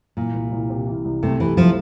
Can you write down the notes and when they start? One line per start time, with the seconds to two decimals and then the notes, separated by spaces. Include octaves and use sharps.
0.17 A#2 E3
0.34 C2
0.52 C2
0.70 C3
0.87 E3
1.05 C2
1.23 C3 A3
1.40 C3 E3
1.57 F3 E4